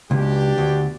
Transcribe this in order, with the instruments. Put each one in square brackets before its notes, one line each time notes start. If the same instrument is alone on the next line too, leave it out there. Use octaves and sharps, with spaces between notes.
[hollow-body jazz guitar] C#2 [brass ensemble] B2 D4 G4
[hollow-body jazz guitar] D2